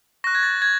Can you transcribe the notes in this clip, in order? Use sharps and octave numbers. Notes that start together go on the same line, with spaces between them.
C#6 F#6 A#6
G#6
A6
G#6